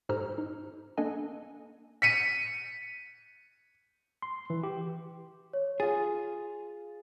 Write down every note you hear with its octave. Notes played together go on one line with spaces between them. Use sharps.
G#2 G4 A4 C5 A#5 F6
D#4
A#3 D4 A4 D#5 G#5
B6 C#7 D#7
C6
E3
G4
C#5
F4 G#4 A6